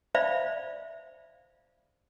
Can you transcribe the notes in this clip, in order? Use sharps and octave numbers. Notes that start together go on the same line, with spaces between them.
C5 D5 E5 F5 B5